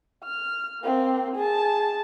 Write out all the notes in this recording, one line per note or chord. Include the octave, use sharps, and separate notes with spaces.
F6
A#3 C4
G#4 A5